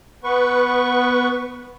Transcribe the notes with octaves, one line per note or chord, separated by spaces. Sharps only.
B3 B4 C#6